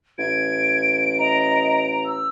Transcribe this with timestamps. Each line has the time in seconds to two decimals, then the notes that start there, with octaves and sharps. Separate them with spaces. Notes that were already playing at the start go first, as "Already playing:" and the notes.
0.18 A1 G#6 D7
1.19 D#5 A#5
2.06 E6